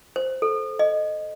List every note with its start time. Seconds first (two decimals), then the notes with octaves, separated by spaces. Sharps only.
0.16 C5
0.42 A4
0.79 D#5